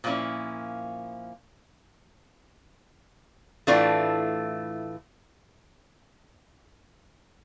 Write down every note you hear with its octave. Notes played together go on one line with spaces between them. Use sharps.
A#2 F3 A#3 C#4 E4
A2 E3 A3 D4 F4